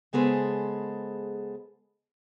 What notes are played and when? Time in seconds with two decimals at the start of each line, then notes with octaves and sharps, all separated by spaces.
0.13 C#3 G#3 B3 G#4 A4 C5